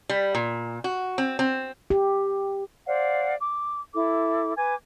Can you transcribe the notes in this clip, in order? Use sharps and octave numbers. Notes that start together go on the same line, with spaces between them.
G3
A#2
F#4
C4
C4
G4
C5 D5 F5 F#5
D6
E4 A4 D6
B4 G#5 D6 G#6